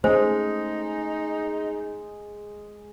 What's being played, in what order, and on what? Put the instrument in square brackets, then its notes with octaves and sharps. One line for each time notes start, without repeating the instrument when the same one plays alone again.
[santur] G#3 [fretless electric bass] A3 C#4 [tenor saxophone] D#4 [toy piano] C5